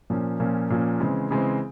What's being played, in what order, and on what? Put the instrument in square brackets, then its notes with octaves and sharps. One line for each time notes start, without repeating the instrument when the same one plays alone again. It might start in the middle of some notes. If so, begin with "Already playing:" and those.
[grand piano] A#2 F3 A#3 C#4
A#2 F3 A#3 C#4
A#2 F3 A#3 C#4
C#3 E3 G#3 C4
C#3 E3 G#3 C4